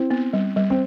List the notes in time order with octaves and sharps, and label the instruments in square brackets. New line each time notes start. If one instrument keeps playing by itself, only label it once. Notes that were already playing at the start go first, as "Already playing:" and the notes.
Already playing: [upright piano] C4 [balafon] E4
[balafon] B3
G3
G3
[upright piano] C4